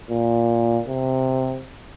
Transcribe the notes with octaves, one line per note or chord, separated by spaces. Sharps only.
A#2
C3